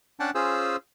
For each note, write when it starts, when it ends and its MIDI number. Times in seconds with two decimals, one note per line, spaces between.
0.20 0.31 61
0.20 0.31 62
0.20 0.31 78
0.20 0.31 79
0.20 0.31 81
0.35 0.76 61
0.35 0.76 65
0.35 0.76 68
0.35 0.76 72
0.35 0.76 88